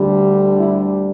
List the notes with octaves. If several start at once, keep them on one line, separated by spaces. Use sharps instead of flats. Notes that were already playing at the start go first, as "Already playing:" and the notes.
Already playing: D2 D3 G3
E4